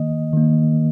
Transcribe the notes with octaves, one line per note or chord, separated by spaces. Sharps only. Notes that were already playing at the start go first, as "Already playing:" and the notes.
Already playing: D#3 A#3 D#5
D#3 A#3